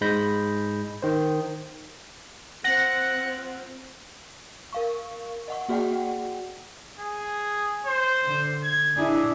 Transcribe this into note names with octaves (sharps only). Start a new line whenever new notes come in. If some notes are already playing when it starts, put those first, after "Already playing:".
G#2 G#3 B5 G6 A#6
D#3 C5
C4 F4 F#5 A#6
A#4 F5 C#6
D#5 F#5 C#6
A#3 F#4 G#4 D5 F#5 G5
G#4
C5
D3
G#6
D4 E4 G#4